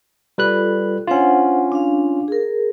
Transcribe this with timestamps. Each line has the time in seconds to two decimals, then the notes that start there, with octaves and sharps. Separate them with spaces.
0.38 G3 F4 A4 B4 F#6
1.07 C#4 D4 F4 C5 F#5
1.72 D4 F5
2.28 G#4 A#4